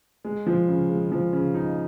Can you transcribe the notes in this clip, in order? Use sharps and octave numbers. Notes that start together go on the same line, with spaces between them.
G#3
F3
C#3
G#3
F3
C#3
D#4